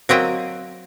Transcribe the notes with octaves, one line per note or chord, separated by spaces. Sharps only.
F#3 A#3 C4 D#5 E5 G5